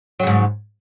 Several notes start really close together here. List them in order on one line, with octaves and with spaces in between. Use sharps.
F#3 C#3 G#2